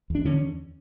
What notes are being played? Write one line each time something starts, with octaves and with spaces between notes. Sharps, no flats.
E2 D4
D3 C#4